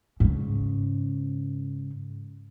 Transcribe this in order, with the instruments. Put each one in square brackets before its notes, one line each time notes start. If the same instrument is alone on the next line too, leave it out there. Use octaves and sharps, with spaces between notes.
[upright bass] G#2 C#3